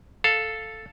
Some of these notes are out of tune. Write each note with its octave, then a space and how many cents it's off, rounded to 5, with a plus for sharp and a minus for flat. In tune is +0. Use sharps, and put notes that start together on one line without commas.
A4 +0 F5 +0